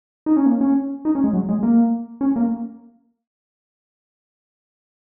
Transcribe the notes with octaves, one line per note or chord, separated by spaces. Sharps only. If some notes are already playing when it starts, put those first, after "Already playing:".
D#4
C#4
A#3
C#4
D#4
C#4
G#3
F#3
G#3
A#3
C#4
A#3